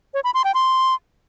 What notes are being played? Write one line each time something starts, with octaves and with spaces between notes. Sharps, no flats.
C#5
B5
C6
G5
C6